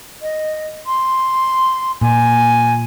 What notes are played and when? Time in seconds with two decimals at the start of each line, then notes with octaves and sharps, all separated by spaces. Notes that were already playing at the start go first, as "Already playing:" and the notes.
0.22 D#5
0.87 C6
2.02 A#2 G#5